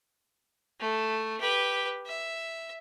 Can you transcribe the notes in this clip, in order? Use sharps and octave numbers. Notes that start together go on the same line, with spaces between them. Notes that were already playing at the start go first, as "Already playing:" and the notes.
A3
G4 B4
E5